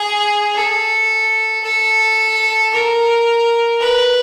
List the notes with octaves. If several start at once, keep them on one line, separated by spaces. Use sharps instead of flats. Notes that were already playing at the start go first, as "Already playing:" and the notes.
Already playing: G#4
A4
A4
A#4
B4